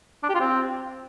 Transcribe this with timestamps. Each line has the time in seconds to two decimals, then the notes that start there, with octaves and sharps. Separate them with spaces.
0.23 D4
0.29 G4
0.35 F4
0.40 C4